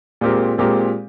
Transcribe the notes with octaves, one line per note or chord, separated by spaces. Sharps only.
A#2 G#3 C4 G4 A#4
A#2 G#3 C4 G4 A#4